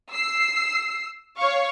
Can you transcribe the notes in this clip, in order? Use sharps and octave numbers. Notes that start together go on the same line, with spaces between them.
E6 C7
C#5 F5 C#6